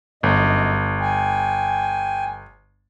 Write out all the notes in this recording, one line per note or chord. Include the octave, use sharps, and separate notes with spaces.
G1 F#2 D#5
G5 G#5